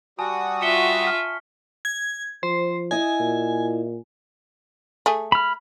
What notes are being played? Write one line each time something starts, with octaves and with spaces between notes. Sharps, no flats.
G3 F#4 G#5 A5 D#6
F4 E5 C#6 C#7 G7
F6 B6
G#6
F3 C5
E4 D#5 G#5
A#2
A3 G#4
B5 F6